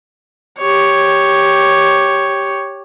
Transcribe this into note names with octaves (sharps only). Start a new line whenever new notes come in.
G4 C#5